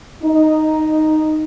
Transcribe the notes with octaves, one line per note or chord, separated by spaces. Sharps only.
D#4